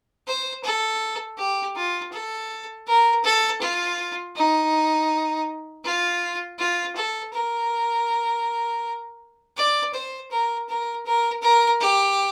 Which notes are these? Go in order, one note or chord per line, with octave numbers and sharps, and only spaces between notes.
C5
A4
G4
F4
A4
A#4
A4
F4
D#4
F4
F4
A4
A#4
D5
C5
A#4
A#4
A#4
A#4
G4